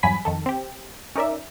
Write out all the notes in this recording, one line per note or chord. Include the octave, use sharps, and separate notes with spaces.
E2 G2 F#3 G#5 B5 B6
F2 D#3 A4
C4 G4
C#4 D#4 A#4 D5 E5